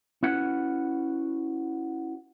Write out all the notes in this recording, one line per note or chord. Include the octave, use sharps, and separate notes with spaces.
C#4 E4 F#4 B4 F#5